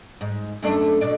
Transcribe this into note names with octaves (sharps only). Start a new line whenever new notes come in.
G#2
F#2 A3 D4
B2 D4 D5